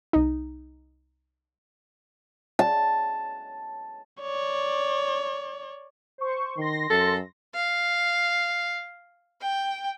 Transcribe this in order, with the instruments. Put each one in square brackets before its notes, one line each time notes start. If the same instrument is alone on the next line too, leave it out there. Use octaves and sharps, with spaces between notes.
[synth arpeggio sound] C2 D#4
[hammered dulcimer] A5
[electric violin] C#5 D5
[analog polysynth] C5 C#6
[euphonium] D#3 [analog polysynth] C6 A#6
[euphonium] F#2 [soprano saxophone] A4
[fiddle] F5
G5